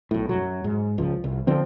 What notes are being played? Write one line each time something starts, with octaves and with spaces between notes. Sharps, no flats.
B1 A2
F#2 F#3
G#2
C#2 F3
C2
D3 F3 C4